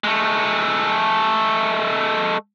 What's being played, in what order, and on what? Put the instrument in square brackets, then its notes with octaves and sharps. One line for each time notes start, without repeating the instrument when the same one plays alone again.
[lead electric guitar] G#3 A3